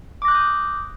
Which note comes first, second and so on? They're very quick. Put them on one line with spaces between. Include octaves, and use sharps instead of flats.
D6 A#6 F#6 G6 D#6